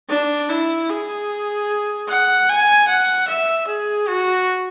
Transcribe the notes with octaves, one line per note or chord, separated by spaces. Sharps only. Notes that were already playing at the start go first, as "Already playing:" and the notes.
D4
E4
G#4
F#5
G#5
F#5
E5
G#4
F#4